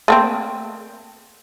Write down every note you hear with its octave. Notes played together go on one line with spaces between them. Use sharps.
A3 A#3 C4